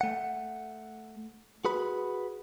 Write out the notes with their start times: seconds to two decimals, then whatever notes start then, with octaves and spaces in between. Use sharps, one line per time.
0.01 A3 F#5
1.65 F#4 G#4 B4 B5